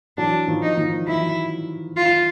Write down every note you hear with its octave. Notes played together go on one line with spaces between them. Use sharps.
E3 F#3 D4
D#3 F3
D#4
D#3 F3
E3 F#3 E4
F4